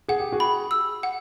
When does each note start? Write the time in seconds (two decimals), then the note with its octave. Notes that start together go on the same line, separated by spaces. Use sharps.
0.08 G#4 F#5
0.20 G4
0.32 F#4 G#4
0.40 B5
0.71 E6
1.03 F#5